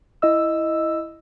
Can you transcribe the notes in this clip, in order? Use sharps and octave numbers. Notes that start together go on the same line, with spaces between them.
E4 D#5 E6